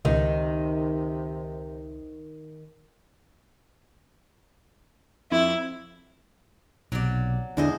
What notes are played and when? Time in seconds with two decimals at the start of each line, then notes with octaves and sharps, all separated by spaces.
0.05 C#2 C3 D#3 D#4
5.31 F2 E4
6.92 B1 C3 F#3 D5
7.57 E2 D3 G#3 D4 E4 C5 D#5